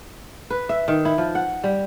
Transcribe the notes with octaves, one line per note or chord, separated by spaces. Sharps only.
B4
E5
D#3
E4
F3
F#5
G3